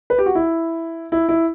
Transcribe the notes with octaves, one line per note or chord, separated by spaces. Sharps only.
B4
G4
F#4
E4
E4
E4